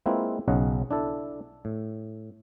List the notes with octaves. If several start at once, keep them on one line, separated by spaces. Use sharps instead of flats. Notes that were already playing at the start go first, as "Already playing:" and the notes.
G#3 A#3 C4 E4 F4 B4
B1 C#3 C#4 D#5 F#5
D4 E4 A4
A2